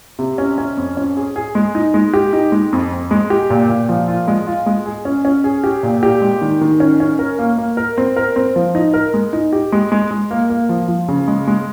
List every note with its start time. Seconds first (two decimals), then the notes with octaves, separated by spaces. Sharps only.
0.19 C3
0.38 C#4
0.58 C#4
0.77 F2
0.97 C#4
1.17 G#4
1.36 G#4
1.55 G#3
1.75 D#4
1.94 G#3
2.13 G4
2.33 D#4
2.52 G#3
2.72 F2
2.91 F2
3.11 G#3
3.30 G4
3.50 A#2
3.69 A#2
3.89 F3
4.08 F4
4.28 G#3
4.47 F4
4.66 G#3
4.86 G#4
5.05 C#4
5.25 C#4
5.44 G#4
5.64 G4
5.83 A#2
6.03 G4
6.22 G#3
6.41 D#3
6.61 D#3
6.80 C#4
7.00 C#4
7.19 A#4
7.39 A#3
7.58 A#3
7.77 A#4
7.98 C4
8.16 A#4
8.36 C4
8.56 F3
8.75 D#4
8.94 A#4
9.14 G#3
9.33 D#4
9.53 G4
9.72 G#3
9.92 G#3
10.11 G#3
10.31 A#3
10.50 A#3
10.69 F3
10.88 F3
11.08 C#3
11.28 G#3
11.48 G#3